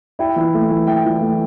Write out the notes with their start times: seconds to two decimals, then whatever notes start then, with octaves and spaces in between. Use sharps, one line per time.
0.19 E4 G5
0.36 E3
0.54 A3
0.70 E3
0.87 E4 G5
1.05 E3
1.21 A3